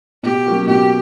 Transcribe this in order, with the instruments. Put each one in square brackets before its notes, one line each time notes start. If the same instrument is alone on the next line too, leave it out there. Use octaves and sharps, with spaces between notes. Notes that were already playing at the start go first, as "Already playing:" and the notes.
[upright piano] B2 [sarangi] G4
[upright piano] F#3 A#3 C#4 F#4
[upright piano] B2 [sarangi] G4